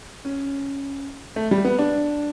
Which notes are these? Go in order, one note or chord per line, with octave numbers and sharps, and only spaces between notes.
C#4
A3
G3
B3
D4